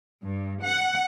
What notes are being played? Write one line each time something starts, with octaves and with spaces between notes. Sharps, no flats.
G2
F#5